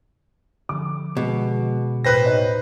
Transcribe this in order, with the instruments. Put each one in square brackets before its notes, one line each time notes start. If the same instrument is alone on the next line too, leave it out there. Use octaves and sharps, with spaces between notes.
[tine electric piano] D3 F3 [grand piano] D6
[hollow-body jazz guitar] B2 [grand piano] G#3
[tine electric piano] E2 A2 [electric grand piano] B4 C5 A#6 [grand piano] G5 F#6
[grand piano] D#4 C#5 D#5